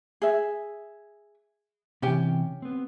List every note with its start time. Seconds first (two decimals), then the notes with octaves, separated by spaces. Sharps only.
0.22 G#4 E5
2.02 C3 E3 C#4 G4 G5
2.62 B3 C4